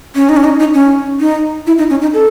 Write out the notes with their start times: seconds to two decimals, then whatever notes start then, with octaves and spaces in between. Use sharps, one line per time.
0.15 C#4
0.29 D#4
0.37 C#4
0.44 D#4
0.59 D#4
0.74 C#4
1.20 D#4
1.67 E4
1.78 D#4
1.90 C#4
2.02 D#4
2.14 A4